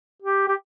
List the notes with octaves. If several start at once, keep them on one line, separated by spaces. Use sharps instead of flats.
G4
G4